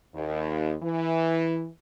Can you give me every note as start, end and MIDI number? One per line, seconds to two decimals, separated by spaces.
0.15 0.74 39
0.83 1.67 52